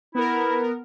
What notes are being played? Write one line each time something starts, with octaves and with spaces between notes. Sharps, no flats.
B3 E4 A#4